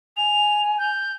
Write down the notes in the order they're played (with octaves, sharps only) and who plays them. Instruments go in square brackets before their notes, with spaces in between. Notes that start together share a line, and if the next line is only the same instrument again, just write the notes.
[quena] G#5 [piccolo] F7
[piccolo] G6